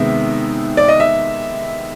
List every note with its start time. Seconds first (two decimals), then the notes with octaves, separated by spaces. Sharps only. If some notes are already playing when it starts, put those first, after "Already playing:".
Already playing: C3 D#3 G#3 B3 E5
0.77 D5
0.88 D#5
1.00 E5